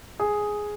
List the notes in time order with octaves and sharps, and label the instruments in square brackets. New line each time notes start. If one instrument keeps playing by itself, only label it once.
[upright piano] G#4